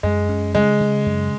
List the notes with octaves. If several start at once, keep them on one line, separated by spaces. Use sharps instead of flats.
F#2 G#3
C#4
C#3 G#3
C#3
F#2